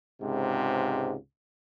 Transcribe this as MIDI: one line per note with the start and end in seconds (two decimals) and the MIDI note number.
0.21 1.15 37
0.21 1.15 44
0.21 1.15 48